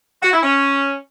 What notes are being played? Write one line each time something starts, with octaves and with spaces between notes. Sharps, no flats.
F#4
E4
C#4